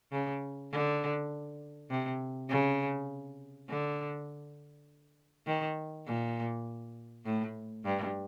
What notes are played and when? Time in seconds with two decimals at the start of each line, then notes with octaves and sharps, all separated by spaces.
0.12 C#3
0.72 D3
1.90 C3
2.49 C#3
3.69 D3
5.46 D#3
6.06 A#2
7.25 A2
7.85 G2